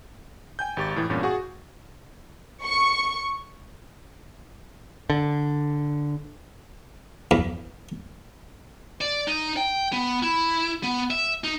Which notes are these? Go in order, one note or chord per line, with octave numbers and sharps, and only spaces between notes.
G5 G#5 G6
G#1 G4 C#6 A6
F2 A2 E3
E2 G2 A#2 C#4
F#4 G#4 F#5 C#6
C#6
D3
E2
D5
D#4
G5
B3
E4
B3
E5
D#4